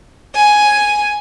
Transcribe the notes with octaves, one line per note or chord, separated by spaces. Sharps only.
G#5